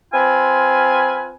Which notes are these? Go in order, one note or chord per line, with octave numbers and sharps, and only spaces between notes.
C4 F4 B4 G#5